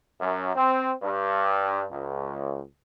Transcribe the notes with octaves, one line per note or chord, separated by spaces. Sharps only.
F#2
C4
G2
C#2